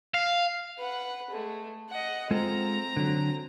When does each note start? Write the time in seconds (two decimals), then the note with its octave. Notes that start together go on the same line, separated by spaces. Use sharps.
0.14 F5
0.78 B4 F#5
1.31 G#3 A3
1.90 D#5 F#5
2.31 G#3 C4 F4 A4 A#5
2.97 D3 F#3